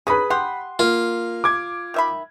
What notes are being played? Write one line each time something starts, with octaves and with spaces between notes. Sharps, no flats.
C#4 D#4 G#4 B4 B5 D#6
G4 F#5 C6
A#3 F4
D6 G#6
D#3 E5 B5